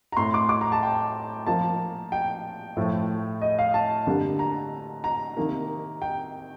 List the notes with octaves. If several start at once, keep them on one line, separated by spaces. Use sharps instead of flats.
A#5
A2 A3 C6
D6
D6
A#5
A5
G5
A#2 F3 A#3 A5
G5
A2 F3 A3
D#5
F5
A5
D3 G3 A#3
A#5
A#5
C3 D#3 A#3
G5